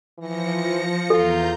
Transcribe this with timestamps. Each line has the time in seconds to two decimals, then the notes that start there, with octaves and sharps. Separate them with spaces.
0.19 E3 F3 A#6 C#7
1.10 E2 F4 A4 A#5 G6